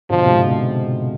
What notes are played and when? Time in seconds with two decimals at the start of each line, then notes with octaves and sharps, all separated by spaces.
0.10 B2 D3 F3
0.26 G#2 C3
0.41 B2